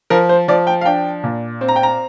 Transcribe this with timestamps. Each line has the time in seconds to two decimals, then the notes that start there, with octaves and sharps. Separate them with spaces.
0.10 F3 A#4
0.29 C5
0.48 F3 D5
0.67 G5
0.81 F5
0.85 D4 G5
1.24 A#2
1.61 C4
1.68 A#5
1.76 G5
1.83 A#5